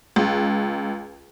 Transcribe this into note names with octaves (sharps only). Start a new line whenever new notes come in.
C#2